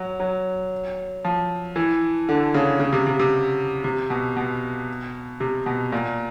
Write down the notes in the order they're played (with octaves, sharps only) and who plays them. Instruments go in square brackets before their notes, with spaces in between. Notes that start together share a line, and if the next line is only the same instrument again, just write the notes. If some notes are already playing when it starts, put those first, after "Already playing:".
Already playing: [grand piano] F#3
F#3
F3
E3
D3
C#3
C#3
C3
C3
C3
C3
B2
B2
C3
B2
A#2